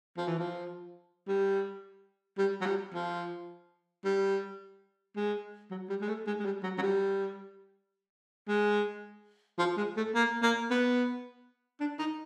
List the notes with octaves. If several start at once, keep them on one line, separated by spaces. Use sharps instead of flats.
F3
E3
F3
G3
G3
F#3
G3
F3
G3
G#3
F#3
G3
G#3
A3
G#3
G#3
G3
F#3
F#3
G3
G#3
F3
G#3
A3
A#3
A#3
B3
D4
D#4